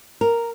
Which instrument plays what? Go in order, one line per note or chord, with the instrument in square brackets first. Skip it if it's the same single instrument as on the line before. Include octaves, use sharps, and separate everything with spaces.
[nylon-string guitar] A#4